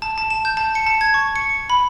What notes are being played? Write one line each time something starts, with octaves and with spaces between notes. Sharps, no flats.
A5
A5
E7
G6
A5
C#7
A5
G#6
C#6
C#7
B5